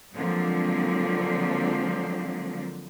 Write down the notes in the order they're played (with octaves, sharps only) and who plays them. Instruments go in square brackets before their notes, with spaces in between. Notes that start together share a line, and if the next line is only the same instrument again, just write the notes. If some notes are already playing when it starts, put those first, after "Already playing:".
[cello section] D3 F3 F#3 G#3 A#3 C4